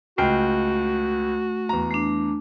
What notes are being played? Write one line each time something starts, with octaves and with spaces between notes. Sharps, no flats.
C#2 A3 F#4 G5 F6
E2 A#5
A3 D4